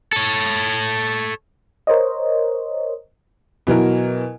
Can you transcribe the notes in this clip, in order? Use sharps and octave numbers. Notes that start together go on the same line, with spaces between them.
A4 C#5
A#4 C5 C#5 D#5
B2 E3 F#3 A#4